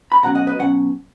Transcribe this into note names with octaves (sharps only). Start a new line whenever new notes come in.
B5
B2 F#3 C#4 F#5 A#5
D#5 F#5
B4 D#5
B2 F#3 C#4 F#5